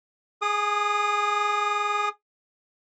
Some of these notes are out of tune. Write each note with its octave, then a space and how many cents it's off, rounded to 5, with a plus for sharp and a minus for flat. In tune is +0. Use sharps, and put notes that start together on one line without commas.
G#4 +0 D#6 -30